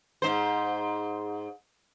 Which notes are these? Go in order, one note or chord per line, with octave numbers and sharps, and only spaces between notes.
G#2 C5